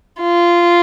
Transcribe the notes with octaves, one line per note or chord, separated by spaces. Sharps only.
F4